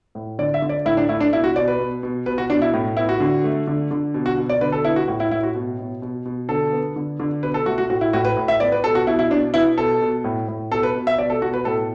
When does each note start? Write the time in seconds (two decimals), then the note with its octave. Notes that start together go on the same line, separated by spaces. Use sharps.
0.15 A2
0.39 D3 D5
0.54 E5
0.62 D3
0.69 D5
0.85 A2 E4
0.97 D4
1.09 A3 E4
1.20 D4
1.33 B2 E4
1.44 F#4
1.56 B2 D5
1.68 B4
1.79 B2
2.03 B2
2.26 B2 B4
2.38 F#4
2.50 B2 D4
2.62 E4
2.73 A2
2.97 B3 E4
3.09 F#4
3.20 D3
3.44 A3
3.67 D3
3.91 D3
4.14 B2
4.26 F#4
4.38 B2
4.49 D5
4.61 D3 B4
4.72 A4
4.85 B3 E4
4.96 F#4
5.08 A2 F#4
5.20 E4
5.31 A2 E4
5.43 F#4
5.55 B2
5.79 B2
6.02 B2
6.25 B2
6.49 D3 A4
6.72 B3
6.96 D3
7.20 D3
7.43 B2 B4
7.54 A4
7.66 A3 F#4
7.78 F#4
7.90 A2 F#4
8.01 E4
8.13 A2 F#4
8.25 B4
8.37 A2
8.48 E5
8.60 B3 D5
8.72 B4
8.84 B2 A4
8.95 F#4
9.07 B2 E4
9.19 E4
9.31 B2 D4
9.54 B3 E4
9.77 B2 A4
10.01 B2
10.24 A2
10.48 A2
10.71 B2 A4
10.83 B4
10.95 B2
11.07 E5
11.18 B2 D5
11.30 A4
11.42 B2 F#4
11.54 B4
11.65 A2 A4